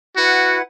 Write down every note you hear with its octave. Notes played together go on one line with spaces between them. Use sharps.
E4 F#4 B4 F#5